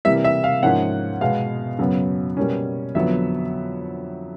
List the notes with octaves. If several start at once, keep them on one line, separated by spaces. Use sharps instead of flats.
C3 E3 G3 A#3 E5
E5
F5
G#2 F3 A#3 C#4 F#5
B2 G#3 B3 F5
F#2 C#3 F#3 B3
B2 G3 A#3 C#4
F2 D3 F#3 B3 E5